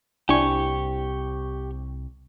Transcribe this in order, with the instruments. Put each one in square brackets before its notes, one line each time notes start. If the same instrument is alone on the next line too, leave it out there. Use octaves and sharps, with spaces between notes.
[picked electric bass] C2 [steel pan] D4 E4 G#5 [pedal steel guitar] G4 C#6